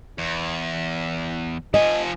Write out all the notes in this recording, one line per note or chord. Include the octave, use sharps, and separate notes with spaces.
E2
F3 D#5 G#5